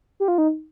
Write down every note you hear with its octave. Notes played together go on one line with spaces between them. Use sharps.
G4
F4
D#4